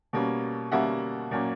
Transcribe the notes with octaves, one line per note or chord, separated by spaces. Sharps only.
B2 G3 A#3 C#4
B2 G3 A#3 C#4 E5 F#5
A#2 F#3 A#3 C#4